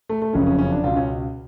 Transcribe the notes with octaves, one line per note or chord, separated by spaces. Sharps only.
A3
A3
F#1 F2 C#3 C#4
C#4
C#4
D4
C#2 B2 F4
C#4